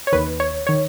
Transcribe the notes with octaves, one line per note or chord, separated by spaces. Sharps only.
C#5
D#2 D#3 B4
C#5
D#3 C#5